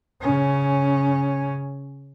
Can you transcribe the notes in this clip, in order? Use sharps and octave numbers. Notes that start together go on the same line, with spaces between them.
C#3 C#4